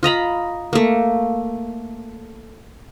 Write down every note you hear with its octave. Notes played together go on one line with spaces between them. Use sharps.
F4 D#5 A#5 B5
A3 A#3